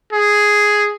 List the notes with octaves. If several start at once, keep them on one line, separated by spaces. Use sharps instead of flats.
G#4